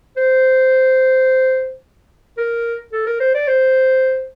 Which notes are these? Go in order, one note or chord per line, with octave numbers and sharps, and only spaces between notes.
C5
A#4
A4
A#4
C5
D5
C5